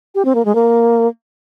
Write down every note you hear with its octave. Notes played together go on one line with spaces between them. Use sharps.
G4
C4
A#3
G#3
A#3